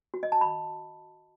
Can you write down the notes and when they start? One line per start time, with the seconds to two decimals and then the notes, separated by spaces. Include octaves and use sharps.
0.14 F#4
0.23 D#5
0.32 A5
0.41 B5